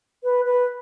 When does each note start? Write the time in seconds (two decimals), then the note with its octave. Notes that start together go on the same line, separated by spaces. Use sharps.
0.23 B4
0.45 B4